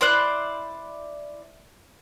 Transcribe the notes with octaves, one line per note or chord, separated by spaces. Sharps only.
E4 C5 D5 F#6